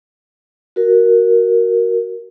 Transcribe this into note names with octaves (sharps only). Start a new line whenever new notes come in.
F#4 A#4